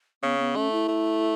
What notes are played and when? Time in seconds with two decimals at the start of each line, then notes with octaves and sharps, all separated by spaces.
0.23 C#3 B3
0.39 B3
0.55 A3 C#4
0.72 E4
0.88 A3